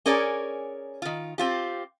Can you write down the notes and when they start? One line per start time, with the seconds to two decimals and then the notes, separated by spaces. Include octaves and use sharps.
0.06 C#4 G#4 A#4 C#5 D5
1.02 D#3 F4
1.38 C4 F4 G4